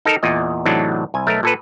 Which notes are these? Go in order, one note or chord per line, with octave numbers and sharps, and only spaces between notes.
D#4 A4 A#4
E2 A#2 D#5
E2 A2 C3 F#3 D4 D#4
C2 G#5
B1 A3 A#4
A#2 A4 B4